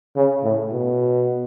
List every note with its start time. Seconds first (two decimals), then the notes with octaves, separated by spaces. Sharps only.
0.16 C#3
0.44 A2
0.72 B2